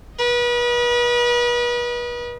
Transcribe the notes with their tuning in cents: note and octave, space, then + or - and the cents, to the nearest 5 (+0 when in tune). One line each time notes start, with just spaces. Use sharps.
B4 -35 D#5 +0